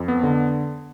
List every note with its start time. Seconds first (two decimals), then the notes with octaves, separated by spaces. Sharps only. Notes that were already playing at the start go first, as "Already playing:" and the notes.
Already playing: F2
0.08 B3
0.23 D3